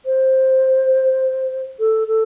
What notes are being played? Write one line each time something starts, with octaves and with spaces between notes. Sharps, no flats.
C5
A4
A4